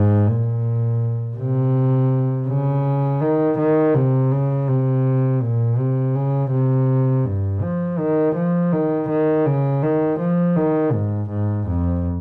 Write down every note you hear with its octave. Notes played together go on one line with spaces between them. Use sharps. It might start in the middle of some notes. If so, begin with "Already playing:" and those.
Already playing: G#2
A#2
C3
C#3
D#3
D#3
C3
C#3
C3
A#2
C3
C#3
C3
G2
F3
D#3
F3
D#3
D#3
C#3
D#3
F3
D#3
G#2
G#2
F2